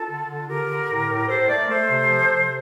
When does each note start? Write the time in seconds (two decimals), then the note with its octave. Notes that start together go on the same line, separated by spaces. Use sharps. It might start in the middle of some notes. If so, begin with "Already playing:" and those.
Already playing: F4 A4
0.08 D3
0.28 D3
0.48 D3 G4 A#4
0.68 D3
0.88 A2
1.08 A2
1.28 A2 A4 C5
1.49 A3 A#4 D5
1.68 A3 A4 C5
1.89 C3
2.09 F3
2.30 C3